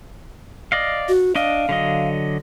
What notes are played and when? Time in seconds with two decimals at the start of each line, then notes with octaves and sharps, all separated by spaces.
0.72 D5 D#5 F5
1.09 F#4
1.35 D4 D#5 F5
1.69 D3 F#3 D#5